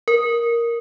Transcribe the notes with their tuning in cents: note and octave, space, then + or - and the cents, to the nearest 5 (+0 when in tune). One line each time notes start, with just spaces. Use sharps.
A#4 +5